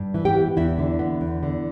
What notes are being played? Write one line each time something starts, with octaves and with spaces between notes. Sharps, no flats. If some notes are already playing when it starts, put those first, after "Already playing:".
Already playing: G2
E3
G4 G5
B3
E2 E4 E5
D3
B3
E2
D3